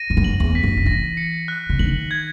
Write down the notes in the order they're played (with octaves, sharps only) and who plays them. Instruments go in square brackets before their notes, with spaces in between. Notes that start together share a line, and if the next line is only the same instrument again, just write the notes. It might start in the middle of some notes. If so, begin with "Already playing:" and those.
Already playing: [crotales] A#6 D#7
[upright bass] G#2
F#2
[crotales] F#7
[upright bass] E2
[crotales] B6
[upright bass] F#2
D#3
[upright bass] E3 [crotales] A#6
[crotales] C#7
F#6
[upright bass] C#3
[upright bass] D#3 [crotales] F#7
[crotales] G#6